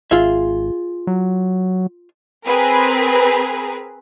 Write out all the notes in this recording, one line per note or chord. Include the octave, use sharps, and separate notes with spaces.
G#1 F4 G#4 E5
F#3
C4 G#4 A#4 B4